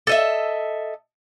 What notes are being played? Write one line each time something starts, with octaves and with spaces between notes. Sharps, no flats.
A4 D#5 E5